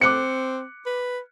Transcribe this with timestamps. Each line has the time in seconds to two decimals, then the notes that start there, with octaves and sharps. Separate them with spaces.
0.01 C4 D6 F#6 C#7
0.86 B4